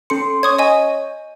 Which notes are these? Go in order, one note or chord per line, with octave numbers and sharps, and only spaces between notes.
C#4 A4 C6 C#7
C#5 C#6 D#6 G#6
D#5 G#5